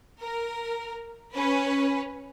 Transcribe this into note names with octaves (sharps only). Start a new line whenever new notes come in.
A#4
C#4 B4